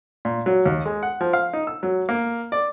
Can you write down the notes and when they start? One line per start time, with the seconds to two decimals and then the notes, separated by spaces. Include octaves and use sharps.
0.25 A#2
0.46 F#3
0.65 D#2
0.85 G#3
1.03 F#5
1.21 F3
1.33 F5
1.53 D#4
1.67 E6
1.83 F#3
2.09 A#3
2.52 D5